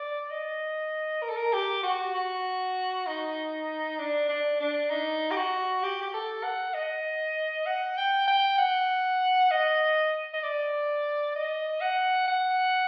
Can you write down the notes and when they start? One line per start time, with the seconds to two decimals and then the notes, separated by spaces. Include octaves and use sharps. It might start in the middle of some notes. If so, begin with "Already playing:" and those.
Already playing: D5
0.30 D#5
1.22 A#4
1.29 A4
1.37 A#4
1.53 G4
1.83 F#4
2.15 F#4
3.06 D#4
3.99 D4
4.29 D4
4.60 D4
4.90 D#4
5.31 G4
5.36 F#4
5.83 G4
6.02 G4
6.14 A4
6.43 F#5
6.74 D#5
7.66 F#5
7.98 G5
8.27 G5
8.58 F#5
9.51 D#5
10.33 D#5
10.43 D5
11.36 D#5
11.81 F#5
12.28 F#5